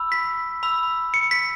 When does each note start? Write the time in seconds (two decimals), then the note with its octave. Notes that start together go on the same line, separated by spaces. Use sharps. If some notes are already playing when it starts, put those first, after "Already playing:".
Already playing: B5 E6
0.12 B6
0.63 B5 E6
1.14 C#7
1.31 B6